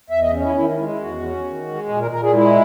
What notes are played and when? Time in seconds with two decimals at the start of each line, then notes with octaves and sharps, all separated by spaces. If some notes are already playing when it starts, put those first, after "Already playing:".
0.10 E2 E5
0.21 D#5
0.33 C#4
0.44 E4
0.55 D#3 E4
0.77 G#3 E4
0.88 E4
0.99 E2 F#4
1.22 C#4
1.44 D#3
1.66 G#3
1.89 A#2 G#4
2.00 A#4
2.11 A#2 A#4
2.22 G#4
2.33 G#3 E4